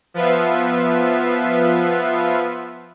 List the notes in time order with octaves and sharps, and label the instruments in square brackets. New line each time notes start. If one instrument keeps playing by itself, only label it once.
[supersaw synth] F3 B3 F4 B4 E5